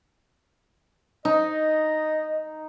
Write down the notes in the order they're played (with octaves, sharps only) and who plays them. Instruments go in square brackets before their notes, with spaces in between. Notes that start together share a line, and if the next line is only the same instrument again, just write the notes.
[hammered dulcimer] D#4 [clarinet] D#5